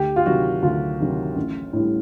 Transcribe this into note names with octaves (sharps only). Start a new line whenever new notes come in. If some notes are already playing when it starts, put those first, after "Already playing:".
Already playing: D2 G4
F4
C3 D#3 F#3 F#4
D2 F4
C3 D#3 F#3
A1
A2 E3 G3